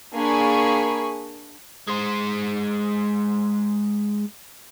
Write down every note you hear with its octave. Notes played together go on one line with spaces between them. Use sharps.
A#3 D4 G#4 G#5 B5 C#6
G#3 C5